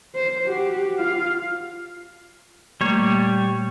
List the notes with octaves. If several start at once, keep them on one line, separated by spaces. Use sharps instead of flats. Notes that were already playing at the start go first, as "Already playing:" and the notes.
C5
F#4 G4
F4 F5
A#2 G3 A3 A#3 C#5